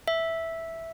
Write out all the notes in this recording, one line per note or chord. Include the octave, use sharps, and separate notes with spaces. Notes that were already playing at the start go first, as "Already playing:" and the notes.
E5